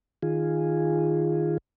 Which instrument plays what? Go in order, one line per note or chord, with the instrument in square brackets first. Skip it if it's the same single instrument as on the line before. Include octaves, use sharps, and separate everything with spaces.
[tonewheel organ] D#3 F4 G#4